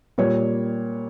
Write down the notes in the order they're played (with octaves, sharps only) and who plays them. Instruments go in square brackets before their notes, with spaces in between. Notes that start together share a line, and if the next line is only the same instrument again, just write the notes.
[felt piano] A#2 G3 A#3 C#5